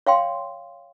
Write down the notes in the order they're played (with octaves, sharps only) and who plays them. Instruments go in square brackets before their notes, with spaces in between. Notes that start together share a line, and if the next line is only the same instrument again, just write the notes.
[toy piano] C#5 F5 G5 C6